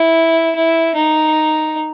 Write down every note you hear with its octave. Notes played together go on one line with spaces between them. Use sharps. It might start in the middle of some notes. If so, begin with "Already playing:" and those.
Already playing: E4
E4
D#4